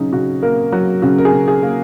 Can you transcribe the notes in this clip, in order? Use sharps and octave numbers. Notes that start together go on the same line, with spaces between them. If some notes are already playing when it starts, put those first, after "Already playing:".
Already playing: C#3 F#3 C#4 D#4
C#3 F#4
A#3 A#4
F#3 F#4
C#3 F#4
A#4
G#4
C#3
G#4
A#3